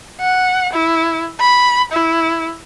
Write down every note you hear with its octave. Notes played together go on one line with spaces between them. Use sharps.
F#5
E4
B5
E4